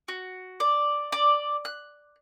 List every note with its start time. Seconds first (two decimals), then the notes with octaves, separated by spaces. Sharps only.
0.08 F#4
0.60 D5
1.12 D5
1.65 F#6